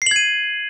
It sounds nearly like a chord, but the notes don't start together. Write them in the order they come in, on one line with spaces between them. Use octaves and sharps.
C7 F#7 G#6 D#7